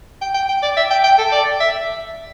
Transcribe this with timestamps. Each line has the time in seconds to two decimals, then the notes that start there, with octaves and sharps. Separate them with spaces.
0.21 G5
0.35 G5
0.49 G5
0.63 D5
0.77 E5
0.91 G5
1.04 G5
1.18 A4
1.32 D5
1.60 E5